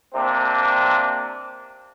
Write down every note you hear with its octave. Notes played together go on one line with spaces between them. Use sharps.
C3 A#3 C4 D4